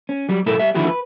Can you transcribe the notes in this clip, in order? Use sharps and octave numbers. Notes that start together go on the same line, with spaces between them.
C#4
F#3 G3
B1 A2 E4 A4 A#4
G3 E5
D3 D#3 F3 E4 F#4 G4
B4